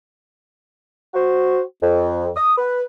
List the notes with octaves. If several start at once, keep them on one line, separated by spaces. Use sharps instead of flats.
F#4 C5
F2
D#6
B4